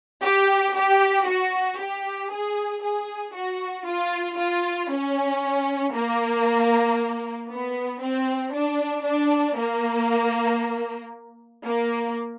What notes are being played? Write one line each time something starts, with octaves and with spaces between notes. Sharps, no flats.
G4
G4
F#4
G4
G#4
G#4
F#4
F4
F4
C#4
A#3
B3
C4
D4
D4
A#3
A#3